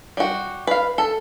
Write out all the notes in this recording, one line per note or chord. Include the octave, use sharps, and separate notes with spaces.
G3 F#4
B4 F5
A4